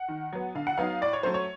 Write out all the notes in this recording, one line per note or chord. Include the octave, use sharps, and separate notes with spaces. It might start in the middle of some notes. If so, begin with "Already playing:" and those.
Already playing: F#5
D#3
F#3 B3
D3 F5
F#5
F#3 B3 D#4 F5
A2 D5
C#5
F#3 A3 C#4 C5
C#5